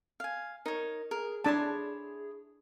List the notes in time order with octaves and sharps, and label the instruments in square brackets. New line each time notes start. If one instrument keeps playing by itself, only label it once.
[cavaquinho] F5 G#5
[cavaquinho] D#4 C#5 [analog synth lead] A#4
[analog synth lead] G#4 [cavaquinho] A#4
[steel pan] D4 A5 [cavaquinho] E4 C#5 C6